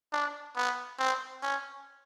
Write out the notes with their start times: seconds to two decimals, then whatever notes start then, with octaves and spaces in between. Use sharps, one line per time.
0.13 D4
0.56 B3
0.99 C4
1.42 C#4